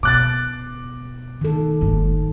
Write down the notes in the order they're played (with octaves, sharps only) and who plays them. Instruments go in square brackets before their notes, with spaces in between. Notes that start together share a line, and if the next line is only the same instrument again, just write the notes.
[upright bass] B2 [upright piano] D6 F#6 A6
[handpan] D#3 A4
[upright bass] F#1 G#2